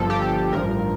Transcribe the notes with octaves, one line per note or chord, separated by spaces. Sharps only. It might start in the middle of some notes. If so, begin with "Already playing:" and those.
Already playing: G1 G2 F3 A4
G4
A4
A1 G2 F3 A#4